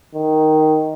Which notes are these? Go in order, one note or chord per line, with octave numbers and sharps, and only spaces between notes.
D#3